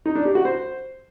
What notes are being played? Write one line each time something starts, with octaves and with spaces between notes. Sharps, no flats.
D#4
D4
G4
F#4
C5